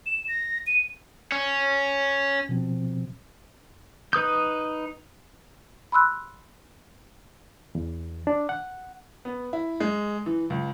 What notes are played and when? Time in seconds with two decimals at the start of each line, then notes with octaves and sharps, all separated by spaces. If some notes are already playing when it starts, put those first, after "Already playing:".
0.06 E7
0.28 A#6
0.67 D#7
1.32 C#4
2.49 B2 F3 C4
4.13 D#4 B4 D#6 G6
5.92 B5 C6 E6 F#6
7.75 E2
8.27 D4
8.49 F#5
9.25 B3
9.53 E4
9.80 G#3
10.26 E3
10.50 C#2